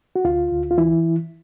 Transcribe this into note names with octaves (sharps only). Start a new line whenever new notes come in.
F#4
D2 F4
D2
F4
E3 E4